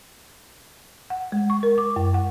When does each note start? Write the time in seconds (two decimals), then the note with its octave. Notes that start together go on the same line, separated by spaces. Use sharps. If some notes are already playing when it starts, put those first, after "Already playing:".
1.10 F#5
1.32 G#3
1.50 C#6
1.63 A#4
1.78 D6
1.96 F#2
2.14 F#5